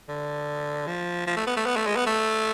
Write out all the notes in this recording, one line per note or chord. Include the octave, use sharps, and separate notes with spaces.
D3
F3
F3
A3
B3
A3
B3
A3
G#3
B3
A3